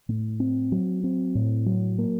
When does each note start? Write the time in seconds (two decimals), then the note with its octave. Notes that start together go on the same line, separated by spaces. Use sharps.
0.09 A2
0.40 C4
0.72 F#3
1.04 C4
1.35 A2
1.66 F#3
1.98 A#3